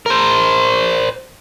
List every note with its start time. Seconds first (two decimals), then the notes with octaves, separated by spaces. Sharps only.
0.06 A#4 C5